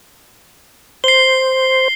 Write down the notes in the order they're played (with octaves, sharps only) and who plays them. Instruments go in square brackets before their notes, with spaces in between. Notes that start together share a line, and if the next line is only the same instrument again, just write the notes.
[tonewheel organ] C5 [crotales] C7 G7